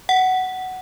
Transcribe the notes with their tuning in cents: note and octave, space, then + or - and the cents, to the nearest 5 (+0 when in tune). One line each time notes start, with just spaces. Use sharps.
F#5 +10